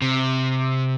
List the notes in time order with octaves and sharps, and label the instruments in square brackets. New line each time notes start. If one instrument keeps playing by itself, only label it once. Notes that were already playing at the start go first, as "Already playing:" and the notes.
[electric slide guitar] C3